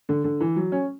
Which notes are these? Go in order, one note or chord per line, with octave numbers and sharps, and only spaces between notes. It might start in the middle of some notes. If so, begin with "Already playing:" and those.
D3
D3
E3
F#3
C#4